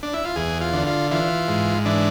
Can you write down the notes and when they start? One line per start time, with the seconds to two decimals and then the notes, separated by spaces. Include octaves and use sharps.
0.03 D4
0.13 E4
0.25 F4
0.36 E2 G#4
0.61 F4
0.73 D3
0.87 F4
1.11 E3 F4
1.48 G#2
1.85 E3 D4